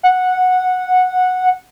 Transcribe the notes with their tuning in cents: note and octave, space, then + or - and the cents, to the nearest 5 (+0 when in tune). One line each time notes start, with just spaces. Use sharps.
F#5 -10